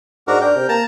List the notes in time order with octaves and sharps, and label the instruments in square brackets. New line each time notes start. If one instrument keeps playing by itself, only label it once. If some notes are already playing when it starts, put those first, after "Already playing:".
[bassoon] G#2 [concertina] D4 F#4 A#4
[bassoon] D4 [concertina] A#4 G5
[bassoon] C3
[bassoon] A#3 [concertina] A5 A#5